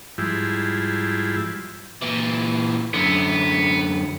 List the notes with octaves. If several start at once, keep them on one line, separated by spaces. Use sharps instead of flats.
G#2 F3 G3 E4
A#2 E3
F#2 D3 B3